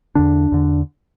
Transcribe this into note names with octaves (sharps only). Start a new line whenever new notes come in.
E2 D3 D4
E2 D3